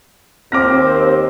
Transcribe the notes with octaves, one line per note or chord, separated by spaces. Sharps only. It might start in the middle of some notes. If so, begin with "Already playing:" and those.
D#2 C4 D6 F6 A#6